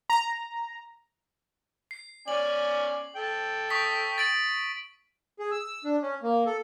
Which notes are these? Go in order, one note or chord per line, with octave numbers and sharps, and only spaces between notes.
A#5
C7
C#4 D5 G#5 F#7
A4 G5
C#6 D#6 B6
A6 D7 F#7
G#4
E6
D4
C#4
A#3
A4